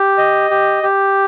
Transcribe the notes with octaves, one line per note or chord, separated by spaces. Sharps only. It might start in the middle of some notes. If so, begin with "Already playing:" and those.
Already playing: G4
D#5
G4
G4